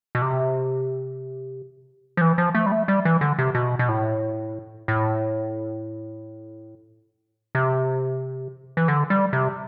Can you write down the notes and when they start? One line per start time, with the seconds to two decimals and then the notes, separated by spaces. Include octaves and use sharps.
0.15 B2
0.22 C3
2.17 F3
2.21 E3
2.38 F3
2.55 A3
2.66 G3
2.72 A3
2.88 G3
3.05 E3
3.21 D3
3.39 C3
3.55 B2
3.79 B2
3.89 A2
4.88 A2
7.55 C3
8.77 E3
8.88 D3
9.10 G3
9.33 C3